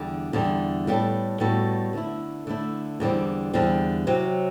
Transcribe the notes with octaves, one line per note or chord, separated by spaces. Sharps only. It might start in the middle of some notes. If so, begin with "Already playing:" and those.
Already playing: E2 D3 G3
E2 D3 G3
A2 G3 B3 F#4 A4
A2 G3 B3 F#4 A4
D3 A3 E4
D3 A3 E4
E2 D3 G3 C4
E2 D3 G3 C4
C3 F#3 C4